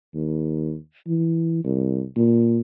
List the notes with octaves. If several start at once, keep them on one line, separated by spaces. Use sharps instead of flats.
D#2
E3
C2
A#2